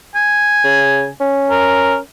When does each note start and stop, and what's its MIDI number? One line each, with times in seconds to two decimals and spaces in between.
0.15 1.10 80
0.64 1.08 49
1.20 1.98 61
1.50 1.97 70